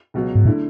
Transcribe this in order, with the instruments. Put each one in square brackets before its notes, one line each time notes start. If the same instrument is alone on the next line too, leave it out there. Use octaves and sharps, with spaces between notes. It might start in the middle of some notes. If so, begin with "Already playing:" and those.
[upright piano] C#2 B2 F#3
[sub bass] G#2
[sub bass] A2 [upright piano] D3 A3 E4